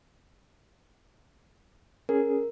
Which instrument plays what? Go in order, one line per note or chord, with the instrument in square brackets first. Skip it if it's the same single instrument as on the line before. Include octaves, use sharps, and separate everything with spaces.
[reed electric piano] C#4 G#4 [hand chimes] A#4